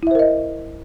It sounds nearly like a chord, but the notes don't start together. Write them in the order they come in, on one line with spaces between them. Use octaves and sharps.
E4 E5 C5 A#4 D#5